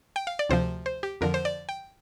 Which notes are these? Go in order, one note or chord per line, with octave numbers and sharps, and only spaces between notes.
G5
F5
D5
D2 C3 F3 C5
C5
G4
F2 D3 F3 A#4
C5
D5
G5